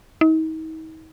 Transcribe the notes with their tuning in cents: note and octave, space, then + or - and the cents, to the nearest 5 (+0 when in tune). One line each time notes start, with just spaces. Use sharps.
D#4 +40